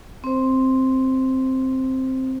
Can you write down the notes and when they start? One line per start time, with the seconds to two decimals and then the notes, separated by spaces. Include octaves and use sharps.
0.24 C4 C5